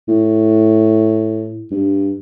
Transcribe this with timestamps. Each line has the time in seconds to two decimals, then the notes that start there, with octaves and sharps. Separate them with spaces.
0.08 A2
1.71 G2